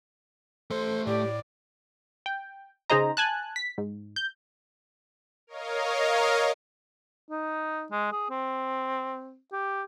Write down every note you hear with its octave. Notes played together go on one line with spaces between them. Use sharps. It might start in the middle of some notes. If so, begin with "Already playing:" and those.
A3 A4 C5 C6
A2 G4 D5
G5
C#3 D#4 G#4 C5 D#5 A#5
G#5 A5 F#6
B6
G#2
G6
A#4 C#5 D#5 F5
D#4
G#3
G#4
C4
G4